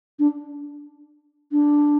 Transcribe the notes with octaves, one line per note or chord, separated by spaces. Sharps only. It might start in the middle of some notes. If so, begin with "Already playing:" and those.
D4
D4